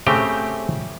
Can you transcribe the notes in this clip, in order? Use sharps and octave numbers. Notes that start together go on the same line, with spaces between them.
C#3 A3 C4 G4 G5